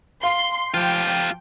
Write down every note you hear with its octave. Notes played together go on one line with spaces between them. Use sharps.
F5 C6
F3 F4 G4 G5